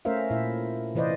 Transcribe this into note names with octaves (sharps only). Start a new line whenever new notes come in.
A3 C#4 A#4 C5 E5 F5
A#2 E4 E5
C3 E3 B4 C5 D5 D#5